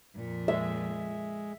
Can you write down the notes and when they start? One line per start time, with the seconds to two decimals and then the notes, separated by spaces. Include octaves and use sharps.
0.16 F2 A#2
0.48 G#3 E5